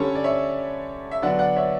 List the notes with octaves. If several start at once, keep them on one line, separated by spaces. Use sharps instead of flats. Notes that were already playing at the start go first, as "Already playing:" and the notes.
Already playing: D3 G3 C#4 A4 C#5
D5
C#5 E5
E5
D3 F#3 B3 D4 D5 F#5
D5 F#5
C#5 E5